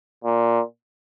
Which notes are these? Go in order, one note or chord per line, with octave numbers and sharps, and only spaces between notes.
A#2